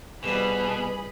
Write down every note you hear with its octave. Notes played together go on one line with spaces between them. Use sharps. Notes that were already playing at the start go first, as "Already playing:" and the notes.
C2 F2 B2 D4 G#4 B4 B5